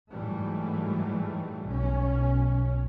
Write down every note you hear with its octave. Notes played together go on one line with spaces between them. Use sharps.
G#2 E3 F#3 G3 A3
B1 C#4